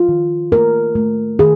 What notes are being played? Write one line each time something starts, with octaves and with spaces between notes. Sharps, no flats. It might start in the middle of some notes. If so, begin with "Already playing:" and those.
Already playing: F4
D#3
A3 A#4
A3
D#3 G#4